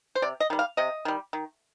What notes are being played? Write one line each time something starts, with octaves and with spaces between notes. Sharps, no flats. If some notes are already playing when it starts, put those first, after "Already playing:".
C5
C3 D5
D#5
D#3 G3
F5
C3 D#5
D#3 G3
D#3